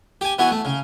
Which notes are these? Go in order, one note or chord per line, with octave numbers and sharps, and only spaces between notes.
G4 G#5
E3 B3 F#4 G#4
A3
C#3